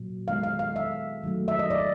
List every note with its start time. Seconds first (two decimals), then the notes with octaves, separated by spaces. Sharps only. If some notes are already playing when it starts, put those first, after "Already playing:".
Already playing: A#2 F#3
0.28 D#3 G#3 B3 F5
0.43 F5
0.59 F5
0.76 E5
1.23 D#3 F#3 A3
1.48 E5
1.59 D#5
1.70 D5